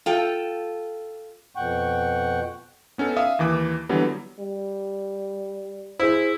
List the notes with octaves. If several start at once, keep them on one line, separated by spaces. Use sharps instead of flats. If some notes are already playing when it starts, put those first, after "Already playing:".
F4 A4 G5
F2 B2 F#5 G5 C#6
B3 C#4 D#4 A4
E5 F5 D#6
D#2 E3 D6
D3 E3 F#3 G3 B3
G3
E4 G#4 C5